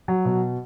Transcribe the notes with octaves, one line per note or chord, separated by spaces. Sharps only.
F#3
B2